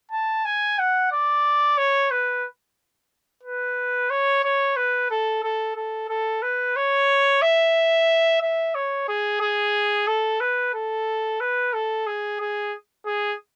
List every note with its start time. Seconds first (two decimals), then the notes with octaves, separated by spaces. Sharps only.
0.12 A5
0.45 G#5
0.79 F#5
1.12 D5
1.78 C#5
2.11 B4
3.43 B4
4.10 C#5
4.44 C#5
4.76 B4
5.10 A4
5.44 A4
5.76 A4
6.09 A4
6.42 B4
6.76 C#5
7.42 E5
8.41 E5
8.75 C#5
9.08 G#4
9.41 G#4
10.08 A4
10.40 B4
10.74 A4
11.40 B4
11.74 A4
12.07 G#4
12.40 G#4
13.06 G#4